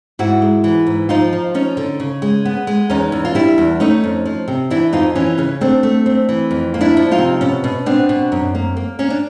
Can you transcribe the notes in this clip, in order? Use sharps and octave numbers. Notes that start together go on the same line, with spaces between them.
G#2 E4 F#4
G#3
E3
G#2
F3 D#4 F4
F3
F3 C#4 D#4
D3
C#3
G#3
B3
G#3
E2 C#4 D#4
E2
F4
G3 D4 E4
E2
A3 C#4 D#4
F2
F3
C3
E3 D4 E4
F2 D#4 F4
E3 C#4
C#3 C#4
A3 C4 D4
A3
C4
E3
F2
A#3
D4 E4
F3
D#4 F4
C3
B2 C#4
B2
B3 C4 D4
B2
F#2
A#3
A#3
A#3 C#4
D4